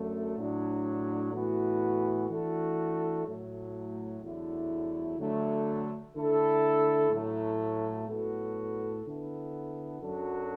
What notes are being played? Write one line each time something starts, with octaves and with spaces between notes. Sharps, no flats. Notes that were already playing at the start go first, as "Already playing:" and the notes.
Already playing: F#2 D3 F#3 A3
A2 F#3 D4
A2 E3 B3 F#4
E3 A3 D4 F#4 A4
A2 F#3 A3
E2 D3 F#3 A3 E4
D3 F#3 A3
D3 A3 E4 A4
A2 F#3 A3
A2 F#3 B3 F#4 A4
D3 B3 E4 A4
F#2 F#3 D4 F#4 A4